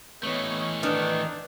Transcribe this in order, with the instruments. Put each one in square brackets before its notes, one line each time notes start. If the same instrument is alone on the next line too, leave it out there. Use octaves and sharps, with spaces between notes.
[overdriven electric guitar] E3 A3 [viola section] B3 C#5 D#5
[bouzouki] D#3 [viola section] D4 [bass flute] B4